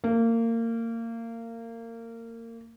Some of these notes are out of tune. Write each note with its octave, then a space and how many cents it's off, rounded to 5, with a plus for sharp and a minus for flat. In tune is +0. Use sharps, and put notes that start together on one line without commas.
A#3 -25